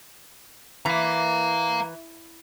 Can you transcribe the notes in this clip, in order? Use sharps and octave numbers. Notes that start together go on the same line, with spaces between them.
E3 F5 A#5